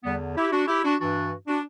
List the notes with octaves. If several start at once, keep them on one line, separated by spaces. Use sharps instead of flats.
E2 D3 G3 B3
E4 G4
D4 F#4
E4 G4
D4 F#4
G2 E3 D4 F#4
D4 F#4